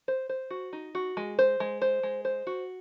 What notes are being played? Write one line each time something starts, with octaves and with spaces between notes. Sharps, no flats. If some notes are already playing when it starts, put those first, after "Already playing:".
C5
C5
F#4
D#4
F#4
G#3
C5
G#3
C5
G#3
C5
F#4